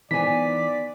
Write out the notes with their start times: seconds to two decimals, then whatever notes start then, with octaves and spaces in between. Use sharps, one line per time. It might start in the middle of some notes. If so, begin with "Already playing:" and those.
0.11 E3 B3 D#4 C5 D5 G#5 B6